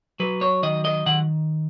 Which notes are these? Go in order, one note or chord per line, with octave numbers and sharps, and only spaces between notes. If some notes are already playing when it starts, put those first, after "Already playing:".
F#3 B4
C#5
D#3 D#5
D#5
D#3 F#5